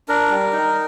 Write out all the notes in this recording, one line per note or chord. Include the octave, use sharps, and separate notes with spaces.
D4 A#4
G3
D#4